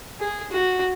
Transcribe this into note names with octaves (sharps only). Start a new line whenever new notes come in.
G#4
F#4